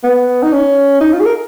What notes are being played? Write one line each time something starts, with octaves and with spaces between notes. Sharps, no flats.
B3
D#4
C#4
D#4
F4
G#4
A#4